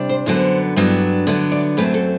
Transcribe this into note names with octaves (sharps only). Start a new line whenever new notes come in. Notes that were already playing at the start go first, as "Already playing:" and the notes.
Already playing: C3 G3 D4
C5
F#2 D3 F#3 B3 C5
G2 F#3 B3 D4
D3 F#3 B3 D5
D5
F#2 F#3 A3 C4 B4
A4